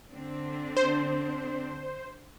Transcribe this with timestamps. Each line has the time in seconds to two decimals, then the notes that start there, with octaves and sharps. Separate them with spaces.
0.11 D3 C4 D4
0.77 C5